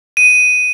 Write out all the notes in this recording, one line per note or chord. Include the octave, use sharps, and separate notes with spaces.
D#7